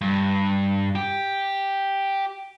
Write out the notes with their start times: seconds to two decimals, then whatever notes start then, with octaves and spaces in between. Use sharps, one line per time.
0.01 G2
0.95 G4